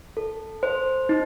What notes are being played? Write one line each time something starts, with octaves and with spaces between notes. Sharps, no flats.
A4
C5
D#4